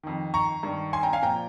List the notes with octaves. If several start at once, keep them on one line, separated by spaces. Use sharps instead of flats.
F2 D#3
A#5 C#6
G2 D#3
G#5 C6
G5 A#5
F5 G#5
A#2 F3 G5 A#5